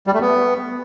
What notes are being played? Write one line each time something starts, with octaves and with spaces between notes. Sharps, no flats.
G3
A3
B3